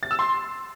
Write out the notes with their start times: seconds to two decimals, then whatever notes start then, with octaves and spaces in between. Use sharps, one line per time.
0.03 A6
0.11 E6
0.19 C6